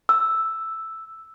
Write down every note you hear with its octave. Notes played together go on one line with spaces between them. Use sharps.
E6